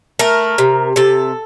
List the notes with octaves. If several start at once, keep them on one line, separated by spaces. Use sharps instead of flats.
A3 A#4
C3
C3 A4